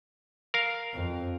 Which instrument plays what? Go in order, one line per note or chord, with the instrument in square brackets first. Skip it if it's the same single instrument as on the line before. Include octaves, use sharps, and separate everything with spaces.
[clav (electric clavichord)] A#4 F5
[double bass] F2